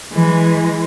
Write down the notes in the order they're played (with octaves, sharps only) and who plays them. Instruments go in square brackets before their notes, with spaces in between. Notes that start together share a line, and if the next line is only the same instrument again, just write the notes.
[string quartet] E3 G#3